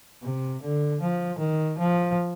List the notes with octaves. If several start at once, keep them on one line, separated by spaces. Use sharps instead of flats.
C3
D3
F3
D#3
F3